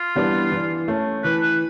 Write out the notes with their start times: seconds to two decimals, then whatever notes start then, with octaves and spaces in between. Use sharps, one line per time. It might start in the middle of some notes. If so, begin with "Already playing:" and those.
Already playing: F4
0.15 E3 G3 B3 D4
0.51 E3
0.88 A3 C#4
1.24 E3 B4
1.43 B4